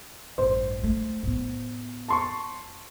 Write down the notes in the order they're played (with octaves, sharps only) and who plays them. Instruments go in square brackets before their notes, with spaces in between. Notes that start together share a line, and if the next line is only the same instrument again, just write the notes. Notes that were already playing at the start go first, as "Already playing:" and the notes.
[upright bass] A1 G2 [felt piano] C5
[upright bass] A3
A2 B3
[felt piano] A5 C6 C#6